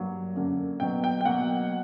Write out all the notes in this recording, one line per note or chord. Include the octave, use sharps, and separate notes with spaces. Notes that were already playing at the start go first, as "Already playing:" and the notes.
Already playing: G2 F#3 A#3
F#2 D3 A#3
B2 F#3 B3 G5
G5
G5
B2 F#3 A#3 F#5